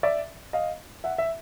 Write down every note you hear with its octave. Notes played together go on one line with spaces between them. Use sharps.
D5 E5
D#5 F5
E5 F#5
E5